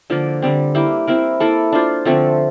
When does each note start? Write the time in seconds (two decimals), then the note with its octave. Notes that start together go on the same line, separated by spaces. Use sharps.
0.10 D3 F3 A#3
0.42 D3 G3 C4
0.75 A#3 E4 G4
1.07 C4 E4 A#4
1.40 A#3 E4 A4
1.72 D4 F4 C5
2.05 D3 F3 A3 C4